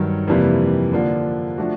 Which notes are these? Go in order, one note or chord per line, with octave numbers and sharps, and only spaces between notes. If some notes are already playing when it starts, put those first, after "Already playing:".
Already playing: G2 D#3 F#3
F2 C3 E3 G3 A#3
D3 F3 A#3 D4
F3 A3 D4 F#4